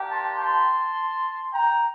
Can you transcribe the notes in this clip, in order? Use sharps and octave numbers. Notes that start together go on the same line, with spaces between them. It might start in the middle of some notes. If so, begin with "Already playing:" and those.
Already playing: A#3 D4 G4
A5 C6
A5 C6
G5 A#5